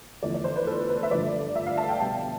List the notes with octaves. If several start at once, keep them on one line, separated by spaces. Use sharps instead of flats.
E2 D3 F3 A3 D5
D5
C5
B4
A4
B4
E5
G2 D3 F3 A3 D5
E5
F5
A5
G5
B2 G3 A5